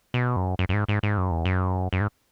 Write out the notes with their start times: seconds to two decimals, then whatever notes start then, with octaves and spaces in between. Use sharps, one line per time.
0.14 B2
0.36 F#2
0.59 F#2
0.69 F#2
0.73 G#2
0.89 G#2
1.03 G#2
1.18 F#2
1.31 E2
1.45 F#2
1.93 F#2
2.01 G#2